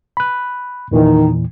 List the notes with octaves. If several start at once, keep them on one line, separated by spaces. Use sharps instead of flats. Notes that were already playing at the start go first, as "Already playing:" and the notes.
B5 F#6
E2 A#2 D#3 E3